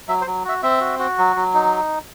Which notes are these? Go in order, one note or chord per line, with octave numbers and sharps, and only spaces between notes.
F#3 E5
C5
F#3
F#4 E5
C4 E5
F#4
F#4
F#3
F#3
D#4